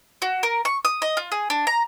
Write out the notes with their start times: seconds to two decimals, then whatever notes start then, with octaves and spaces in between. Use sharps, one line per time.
0.22 F#4
0.43 A#4
0.65 C#6
0.85 D#6
1.02 D#5
1.17 F4
1.32 G#4
1.50 D4
1.67 A#5